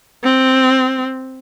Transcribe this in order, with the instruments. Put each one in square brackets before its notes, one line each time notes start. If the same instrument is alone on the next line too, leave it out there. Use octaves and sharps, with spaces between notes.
[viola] C4